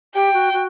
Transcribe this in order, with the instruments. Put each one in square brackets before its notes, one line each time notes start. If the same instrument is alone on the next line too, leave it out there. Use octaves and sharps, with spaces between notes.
[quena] G4 [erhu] G5
[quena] F#4
F#4